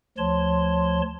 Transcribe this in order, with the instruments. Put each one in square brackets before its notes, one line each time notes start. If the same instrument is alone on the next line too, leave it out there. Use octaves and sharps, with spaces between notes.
[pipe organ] D2 F3 C#5 A5 C6